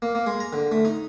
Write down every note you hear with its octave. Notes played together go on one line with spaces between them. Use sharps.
A#3
A#3
G#3
A#5
D3
A3
D#4